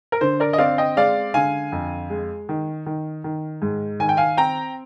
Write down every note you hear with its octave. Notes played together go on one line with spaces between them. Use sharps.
A#4
D3 C5
A#4 D5
D#5
C4 D5 F5
D#5 G5
G#3 D5 F5
D3 F5 G#5
F2
G#3
D#3
D#3
D#3
G#2
D#3 G#5
G5
F5 G#5
C4 G5 A#5